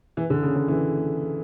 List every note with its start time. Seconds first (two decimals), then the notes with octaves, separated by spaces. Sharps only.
0.17 E3
0.30 D3
0.43 C#3
0.55 D3
0.68 E3